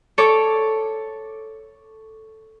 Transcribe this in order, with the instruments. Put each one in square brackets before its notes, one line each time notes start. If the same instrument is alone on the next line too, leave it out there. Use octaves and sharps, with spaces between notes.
[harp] A4 C#5 D6